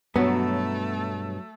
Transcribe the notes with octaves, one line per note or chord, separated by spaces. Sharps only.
G2 B2 F#3 A3 B3 A4